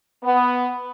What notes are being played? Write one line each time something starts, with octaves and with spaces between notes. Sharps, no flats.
B3